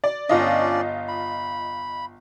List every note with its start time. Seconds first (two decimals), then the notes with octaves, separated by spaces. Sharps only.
0.04 D5
0.29 G1 C#4 D4 F4 D5 D#5
1.08 B5